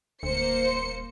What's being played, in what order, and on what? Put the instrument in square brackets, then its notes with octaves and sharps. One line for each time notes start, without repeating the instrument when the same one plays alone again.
[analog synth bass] D#1 [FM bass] D2 [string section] A#3 C5 C#7